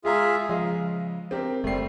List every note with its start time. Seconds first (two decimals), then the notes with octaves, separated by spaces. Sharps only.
0.05 G#3 F4 G#4 E5 A#5
0.49 C#3 F3 G#3 D#5 F5
1.31 C4 G4 A#4
1.64 F#1 G3 A3 C4 C7